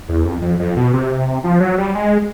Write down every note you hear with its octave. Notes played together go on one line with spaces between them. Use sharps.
E2
F2
F2
F2
B2
C3
F3
F#3
G3
G#3